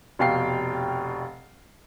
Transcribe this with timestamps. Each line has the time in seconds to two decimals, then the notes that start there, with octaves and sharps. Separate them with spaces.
0.19 F1 B2 F5 G5 C7